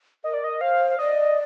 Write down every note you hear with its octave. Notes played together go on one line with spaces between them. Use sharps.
A#4 D#5
D5
D#5
C5 F5
F5
D5 D#5